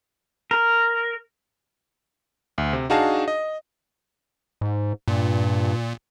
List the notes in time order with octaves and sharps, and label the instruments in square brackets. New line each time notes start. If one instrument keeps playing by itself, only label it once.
[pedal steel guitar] A#4
[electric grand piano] D2
C3
D4 D#4 F#4 G#4 F5 A5
D#5
[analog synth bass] G#2
[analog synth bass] G2 [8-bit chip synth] A#2